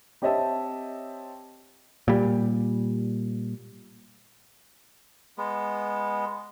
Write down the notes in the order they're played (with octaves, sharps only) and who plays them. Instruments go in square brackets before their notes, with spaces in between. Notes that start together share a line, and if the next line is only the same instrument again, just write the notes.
[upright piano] C4 G4 C#5 D#5 E5 A5
[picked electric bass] A#2 G3
[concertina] G#3 B3